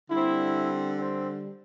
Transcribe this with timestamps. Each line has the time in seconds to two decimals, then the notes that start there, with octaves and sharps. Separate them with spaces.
0.11 D3 G3 C4 E4
0.97 C4